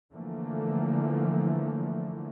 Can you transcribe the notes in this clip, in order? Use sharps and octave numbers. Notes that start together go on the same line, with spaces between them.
D3 E3 F3 A3 A#3